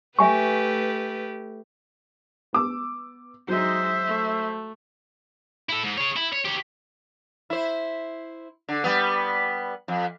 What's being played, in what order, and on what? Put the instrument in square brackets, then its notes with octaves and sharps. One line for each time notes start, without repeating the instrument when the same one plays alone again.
[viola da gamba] A3 G4 B4 [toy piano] E5 G#5 C#6
[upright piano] B3 D6 E6
[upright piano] F#3 [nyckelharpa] G#3 D#4 [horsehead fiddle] C5 E5
[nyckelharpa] A3
[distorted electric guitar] E4 A4
G#2
G#4 C#5
E4
C#5
G4 C#5
[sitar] E4 C5
D3
G3 B3
F2